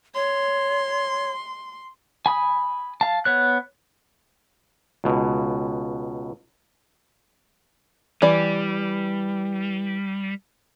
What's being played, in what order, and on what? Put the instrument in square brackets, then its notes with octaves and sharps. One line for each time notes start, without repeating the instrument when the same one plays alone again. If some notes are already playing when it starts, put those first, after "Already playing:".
[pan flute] C#5 [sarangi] C6
[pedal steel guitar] G#5 B5 D#6
F5 A5
B3 C#5 F#6
[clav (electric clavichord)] C#2 B2
[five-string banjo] E3 D5 [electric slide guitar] G3